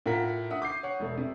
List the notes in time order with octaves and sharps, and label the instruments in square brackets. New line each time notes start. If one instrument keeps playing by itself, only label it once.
[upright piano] A2 F4 A#4 F#5 B6
E5 F#5 D#6
D6 G6 C7
C#5 F#5
E1 A3
C3